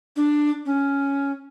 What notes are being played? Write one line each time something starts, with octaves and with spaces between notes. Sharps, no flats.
D4
C#4